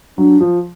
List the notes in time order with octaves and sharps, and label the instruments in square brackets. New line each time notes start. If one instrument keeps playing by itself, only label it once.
[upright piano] F#3 [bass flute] D4
[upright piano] F3